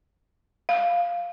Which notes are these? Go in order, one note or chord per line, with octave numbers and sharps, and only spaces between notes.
F5